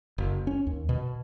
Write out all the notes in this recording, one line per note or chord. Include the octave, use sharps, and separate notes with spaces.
F#1
C#4
D#2
B2